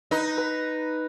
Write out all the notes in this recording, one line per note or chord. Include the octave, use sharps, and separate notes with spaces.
D#4 B4
B4